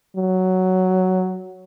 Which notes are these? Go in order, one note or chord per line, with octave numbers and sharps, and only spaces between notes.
F#3